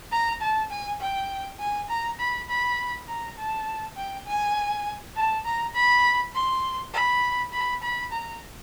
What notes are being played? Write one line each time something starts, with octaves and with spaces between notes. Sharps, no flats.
A#5
A5
G#5
G5
G#5
A#5
B5
B5
A#5
A5
G5
G#5
A5
A#5
B5
C6
B5
B5
B5
A#5